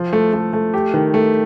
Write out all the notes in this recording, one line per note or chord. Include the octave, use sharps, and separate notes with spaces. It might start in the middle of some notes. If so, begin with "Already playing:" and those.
Already playing: F3
A3
A3
A3
G4
D#3
A3